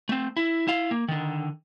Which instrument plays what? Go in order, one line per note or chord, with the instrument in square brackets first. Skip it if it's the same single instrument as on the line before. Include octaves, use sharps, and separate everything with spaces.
[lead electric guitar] A3 C4
E4
E4 F5
A#3
D3 D#3